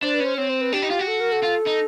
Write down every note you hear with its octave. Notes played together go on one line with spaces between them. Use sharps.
D4 C5
B4
C#4
C5
C4 C#5
C5
B4
D4 G4
D#4
F4
F#4
A4
A#4
A4
F4
D#4